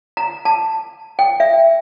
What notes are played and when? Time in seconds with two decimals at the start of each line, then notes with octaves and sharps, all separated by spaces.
0.17 A#5
0.45 A5
1.19 G5
1.40 E5